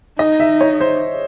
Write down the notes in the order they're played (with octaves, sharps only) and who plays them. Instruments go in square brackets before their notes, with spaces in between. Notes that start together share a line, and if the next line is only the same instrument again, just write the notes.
[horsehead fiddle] D#4 [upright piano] D#5
[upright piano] E5
C#5
C5